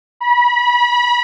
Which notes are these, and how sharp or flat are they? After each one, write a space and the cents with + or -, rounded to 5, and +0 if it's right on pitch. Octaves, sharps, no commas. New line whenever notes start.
B5 -30